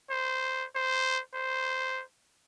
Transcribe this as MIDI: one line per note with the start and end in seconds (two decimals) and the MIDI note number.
0.10 0.66 72
0.75 1.21 72
1.34 2.03 72